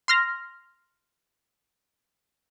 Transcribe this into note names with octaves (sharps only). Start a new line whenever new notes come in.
C6 F6 A#6